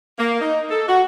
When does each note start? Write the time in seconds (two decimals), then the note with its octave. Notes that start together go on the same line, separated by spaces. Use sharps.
0.18 A#3
0.41 D#4
0.70 A4
0.88 F#4